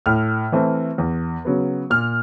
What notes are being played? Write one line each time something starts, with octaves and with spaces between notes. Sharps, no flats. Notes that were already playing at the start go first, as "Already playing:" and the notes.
A2 F6
E3 A3 C4
E2
C#3 F#3 B3
A#2 F6